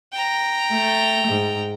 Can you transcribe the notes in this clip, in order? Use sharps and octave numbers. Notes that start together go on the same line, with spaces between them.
G5 A#5
A3
G#2